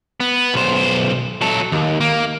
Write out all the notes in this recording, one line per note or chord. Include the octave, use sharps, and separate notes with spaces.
B3
B1 C5
F#3 A4
D#2
A#3